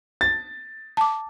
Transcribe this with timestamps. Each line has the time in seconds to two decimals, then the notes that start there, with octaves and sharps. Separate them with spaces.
0.21 A6
0.97 A5 D6